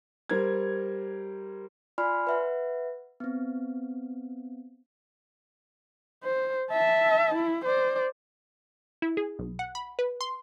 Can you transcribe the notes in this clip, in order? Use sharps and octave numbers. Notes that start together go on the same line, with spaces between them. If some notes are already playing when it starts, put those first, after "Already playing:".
G3 A#4 C5 G#6
F4 D5 G#5 B5 C6 F6
B4 E5 F#5
B3 C4
C5
E5 A5
E4
C5 D5
E4
G#4
B1
F#5
B5
B4
C6